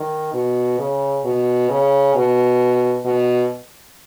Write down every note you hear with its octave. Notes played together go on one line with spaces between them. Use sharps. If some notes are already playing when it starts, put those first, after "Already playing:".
Already playing: D#3
B2
C#3
B2
C#3
B2
B2